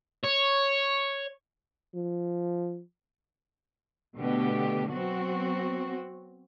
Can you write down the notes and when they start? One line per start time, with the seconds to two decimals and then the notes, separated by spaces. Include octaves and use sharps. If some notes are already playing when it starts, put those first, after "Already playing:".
0.24 C#5
1.95 F3
4.18 B2 D3 A3 B3 G4
4.90 F#3 B3 C4 F#4